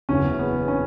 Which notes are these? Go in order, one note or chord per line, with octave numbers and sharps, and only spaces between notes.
F#1 E2 C#3 E3 C#4
B3
C#4